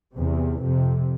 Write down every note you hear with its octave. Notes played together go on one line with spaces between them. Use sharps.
E2 C3
F2 C3